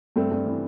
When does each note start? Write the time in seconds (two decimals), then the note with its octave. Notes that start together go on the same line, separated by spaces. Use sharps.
0.16 G2 A3 C4
0.31 G2
0.46 E3